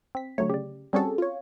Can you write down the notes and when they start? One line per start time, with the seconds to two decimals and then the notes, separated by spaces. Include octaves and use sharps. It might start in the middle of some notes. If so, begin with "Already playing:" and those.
0.15 C4 B6
0.38 D3 F#3 A3 C#5
0.50 C#3 G4 D5
0.93 G3 C4 C#4 F#4 G#4 A4
1.18 F4 C#5